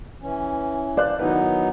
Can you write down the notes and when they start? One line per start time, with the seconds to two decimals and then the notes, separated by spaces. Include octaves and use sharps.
0.21 E3 C#4
0.97 C5 D5 F5 F#6
1.19 D#3 F#3 B3 D#4 E4 B4